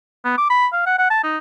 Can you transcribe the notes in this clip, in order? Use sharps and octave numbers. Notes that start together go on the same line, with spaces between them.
B3
D6
B5
F5
F#5
F#5
A5
D#4